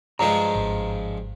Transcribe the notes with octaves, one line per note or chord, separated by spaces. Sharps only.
G2 F3 G#3 A#5
G#1